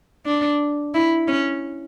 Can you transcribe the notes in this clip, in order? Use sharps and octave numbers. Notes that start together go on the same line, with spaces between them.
D4
E4
C#4